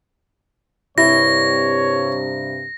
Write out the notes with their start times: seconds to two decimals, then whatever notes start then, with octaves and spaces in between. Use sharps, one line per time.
0.98 G2 C3 E4 C#5 A#6